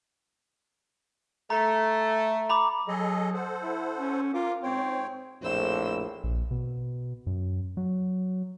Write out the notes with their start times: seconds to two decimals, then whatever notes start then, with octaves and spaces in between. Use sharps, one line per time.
1.50 A3 A#5
2.50 A#5 B5 D6
2.88 F#3 G#4 A4 D#5
3.34 A4 C5 F#5
3.63 E4
3.96 C#4
4.34 F4 A#4 D6
4.63 G#2 C4 C#5 G5
5.42 A#1 F2 A2 C5 E6
6.24 A#1
6.51 B2
7.27 F#2
7.77 F#3